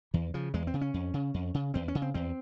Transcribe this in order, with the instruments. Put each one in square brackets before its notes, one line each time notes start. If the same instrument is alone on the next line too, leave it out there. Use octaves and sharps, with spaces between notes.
[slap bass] E2 E3
C#3 F3
E2 G#3
C4
C#3
C#4
F2
C#3
F2
C#3
E2 C4
C#4
C#3
C4
E2 C4